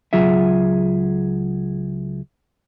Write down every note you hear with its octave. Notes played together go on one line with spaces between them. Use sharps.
C#2 F#3 F4 G#4 E5